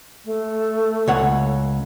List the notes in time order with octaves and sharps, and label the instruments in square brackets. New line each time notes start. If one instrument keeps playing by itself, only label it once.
[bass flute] A3
[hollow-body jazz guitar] C#2 C#5 F#5